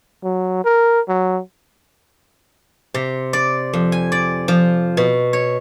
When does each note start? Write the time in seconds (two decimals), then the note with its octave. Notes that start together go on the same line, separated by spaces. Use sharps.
0.23 F#3
0.64 A#4
1.08 F#3
2.94 C3
3.33 D5
3.73 F2
3.92 G#5
4.12 D5
4.48 F3
4.97 B2
5.33 C#5